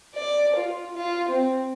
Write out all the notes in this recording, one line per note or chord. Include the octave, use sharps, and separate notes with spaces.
D5
F4
F4
C4